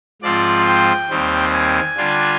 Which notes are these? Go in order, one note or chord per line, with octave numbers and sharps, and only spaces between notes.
G#2 F3 C4 F4 D5
G5
D#2 D#3 G3 C4
G#5
D3 G3 D4 F4